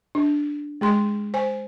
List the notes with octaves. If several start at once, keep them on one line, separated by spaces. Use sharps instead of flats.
D4
G#3 G#4 C6
C5 G#5